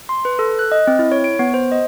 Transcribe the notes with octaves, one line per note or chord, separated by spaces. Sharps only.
C6
B4
A4
F#6
D#5
C4
E4
C#5
D7
B3
C5
D#5